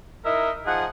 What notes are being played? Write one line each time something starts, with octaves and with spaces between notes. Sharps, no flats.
D#4 E4 A#4 D#5 E5
F3 D#4 G#4 F#5